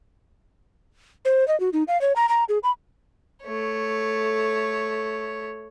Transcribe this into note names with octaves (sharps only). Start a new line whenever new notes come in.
C5
D#5
F#4
D#4
F5
C#5
A#5
A#5
G#4
B5
A3 C#5